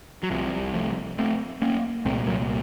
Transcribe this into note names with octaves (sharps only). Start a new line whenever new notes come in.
F#3
C2 C3 F3
F3 A3
A3 C4
A#3 C#4
C2 A#2 A3 C4
F#3 A#3